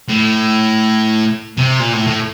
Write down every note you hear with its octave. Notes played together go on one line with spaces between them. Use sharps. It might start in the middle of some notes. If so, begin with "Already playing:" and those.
A2
C3
A#2
A2
A2